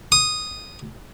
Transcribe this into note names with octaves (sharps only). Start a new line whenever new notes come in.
D#6